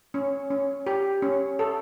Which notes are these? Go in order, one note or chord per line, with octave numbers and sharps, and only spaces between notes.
C#4
C#4
G4
C#4
A4